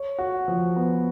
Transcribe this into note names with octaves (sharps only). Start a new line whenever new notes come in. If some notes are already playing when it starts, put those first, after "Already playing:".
Already playing: C#5
F#4
F3
B3